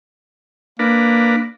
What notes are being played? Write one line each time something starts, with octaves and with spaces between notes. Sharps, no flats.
A#3 D4 A#4 B4